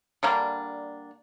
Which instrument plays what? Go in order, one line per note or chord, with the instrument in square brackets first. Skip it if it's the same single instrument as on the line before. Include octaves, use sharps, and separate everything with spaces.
[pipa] D3 G3 A#3 D4